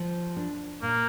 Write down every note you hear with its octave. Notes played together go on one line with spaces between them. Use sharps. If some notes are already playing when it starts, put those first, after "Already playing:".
Already playing: F3
D4
A#2 A#3